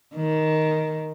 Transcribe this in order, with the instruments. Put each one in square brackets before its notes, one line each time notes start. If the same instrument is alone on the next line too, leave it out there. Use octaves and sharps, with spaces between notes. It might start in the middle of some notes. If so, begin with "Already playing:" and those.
[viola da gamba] D#3